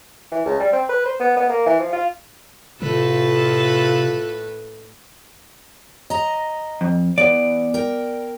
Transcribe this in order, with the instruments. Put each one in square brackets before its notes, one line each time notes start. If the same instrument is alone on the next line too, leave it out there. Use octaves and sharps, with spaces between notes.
[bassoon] E3
C#2
G3
C4
B4
C5
B3
B3
A#3
E3
F3
F4
[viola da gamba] A2 A4 B4 [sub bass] C3 [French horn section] F4
[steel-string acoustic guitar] D#5 A#5
[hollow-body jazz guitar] F2
[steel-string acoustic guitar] E3 B3 [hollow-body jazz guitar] D5
[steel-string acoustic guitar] A#4 G5